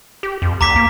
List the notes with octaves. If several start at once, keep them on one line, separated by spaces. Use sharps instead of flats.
G4
F2
D2 A#5 D6 B6
A#3